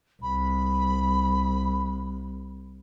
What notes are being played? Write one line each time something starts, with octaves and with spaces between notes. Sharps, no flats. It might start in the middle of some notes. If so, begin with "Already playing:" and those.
C2 B5